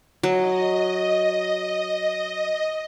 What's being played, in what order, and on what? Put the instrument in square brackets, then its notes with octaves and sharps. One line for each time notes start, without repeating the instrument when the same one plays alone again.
[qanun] F#3 [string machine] D#5